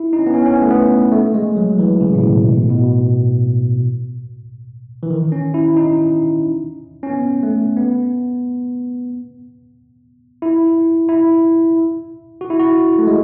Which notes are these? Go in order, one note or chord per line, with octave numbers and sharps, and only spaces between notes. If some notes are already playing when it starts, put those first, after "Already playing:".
Already playing: E4
D#4
C#4
B3
C#4
C#4
B3
A3
B3
A3
G#3
F#3
E3
C#3
A2
B2
B2
A2
B2
E3
D#3
C#4
E4
D#4
C#4
B3
A3
B3
E4
E4
F#4
E4
F#4
A3
G#3